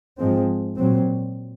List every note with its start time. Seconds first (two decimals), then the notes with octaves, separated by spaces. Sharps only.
0.19 G#2 F3 G#3 C4
0.77 A#2 F#3 C4